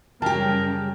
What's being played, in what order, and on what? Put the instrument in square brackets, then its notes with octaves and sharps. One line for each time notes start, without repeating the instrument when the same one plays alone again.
[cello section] F#2 C#3 G3 [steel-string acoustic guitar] G4 G#4 [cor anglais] A#4 [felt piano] G5 A5